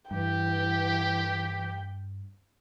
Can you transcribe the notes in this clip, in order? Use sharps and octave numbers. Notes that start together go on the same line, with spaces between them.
G2 E3 G4 G5